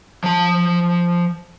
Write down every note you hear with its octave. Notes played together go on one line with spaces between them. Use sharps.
F3 A5